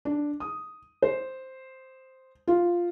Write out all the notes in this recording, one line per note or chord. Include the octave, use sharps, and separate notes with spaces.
D4
D#6
C5
F4